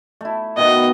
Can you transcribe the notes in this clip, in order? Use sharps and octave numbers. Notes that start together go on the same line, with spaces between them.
A3 E4
B2 D#3 B3 D#5